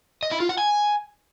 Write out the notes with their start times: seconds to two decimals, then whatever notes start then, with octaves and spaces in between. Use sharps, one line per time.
0.23 D#5
0.31 E4
0.40 F4
0.49 F#5
0.58 G#5